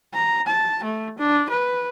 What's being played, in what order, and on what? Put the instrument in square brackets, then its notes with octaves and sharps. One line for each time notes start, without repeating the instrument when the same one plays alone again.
[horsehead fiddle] A#5
A5
A3
D4
B4